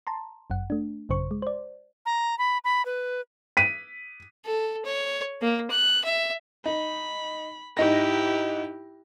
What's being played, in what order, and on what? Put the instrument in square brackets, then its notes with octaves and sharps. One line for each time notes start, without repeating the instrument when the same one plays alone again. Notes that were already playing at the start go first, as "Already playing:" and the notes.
[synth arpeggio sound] A5 A#5 C6
G1 F#2 F#5
A3 D4
A1 F#2 C#3 C5 C#6
G#3
C5 D5
[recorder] A#5
B5
B5
B4
[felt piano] B6 D#7
[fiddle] A4
C#5
A#3
F#6
E5
[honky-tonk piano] D#4 [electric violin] B5
[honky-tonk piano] G#2 D#4 A#6 [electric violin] E4 G4